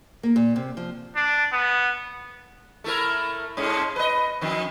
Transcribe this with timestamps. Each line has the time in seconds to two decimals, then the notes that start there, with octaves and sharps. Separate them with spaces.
0.23 A#3
0.36 A#2
0.56 C3
0.77 F3
1.16 D4
1.52 B3
2.84 A3 E4 A#4
3.57 G#2 G#3 C#4
3.96 B4 D#5
4.41 F2 D#3